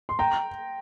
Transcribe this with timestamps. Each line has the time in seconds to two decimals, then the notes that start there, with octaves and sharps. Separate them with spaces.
0.09 C6
0.19 G5 A#5